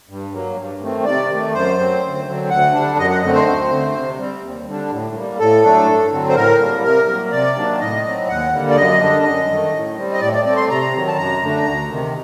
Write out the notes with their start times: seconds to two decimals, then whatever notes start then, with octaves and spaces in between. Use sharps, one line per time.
0.09 G2
0.33 F#3 A#3
0.57 G2
0.81 D#3 A3 C4
1.05 C3 D5
1.29 D#3
1.34 A3
1.53 F#2 C5
1.78 F#3 C4
2.02 D2
2.26 D3 F#3 C4
2.50 D2 F#5
2.74 D3 G3 D4
2.98 F#2 D#5
3.10 F#5
3.22 D3 A3 C4 D#5
3.34 C5
3.46 D2
3.70 D3 A3 C4
3.95 C3
4.19 G3 C4
4.42 D#2
4.67 D3 G3 D4
4.91 A2
5.15 G3 A#3
5.39 A2 A4
5.63 F#3 A3 D4
5.87 G2
6.11 D3 F#3 C4
6.29 C5
6.35 A2 A#4
6.59 G3 A#3
6.83 C3 A#4
7.07 F#3 A#3
7.32 C3 D5
7.56 D#3 F#3 A#3 D4
7.80 A2 D#5
8.04 F#3 C4
8.28 D#2 F#5
8.52 D3 G3 A#3
8.70 D5
8.76 F#2 D#5
9.01 D3 G3 D4
9.25 F#2
9.49 D#3 A3
9.73 A2
9.97 G3 C4
10.12 D#5
10.21 A2 D5
10.33 D5
10.45 A3 C4 D5
10.57 C6
10.69 C3 A#5
10.94 D#3 F#3
11.07 A5
11.18 F#2 A#5
11.42 D3 A3 D4
11.66 D2
11.90 C3 D#3